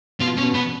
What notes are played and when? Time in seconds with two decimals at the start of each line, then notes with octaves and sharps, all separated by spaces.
0.20 B2 F4
0.37 C#4
0.42 B2
0.54 B3